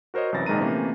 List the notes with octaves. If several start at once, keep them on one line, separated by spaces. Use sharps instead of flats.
F#4 A#4 C5 C#5 D#5
C2 F#2 E3 A6 A#6
A#1 G#2 D#3 G#3 A#5 D#7
C3 E3 A3 A#3 C#4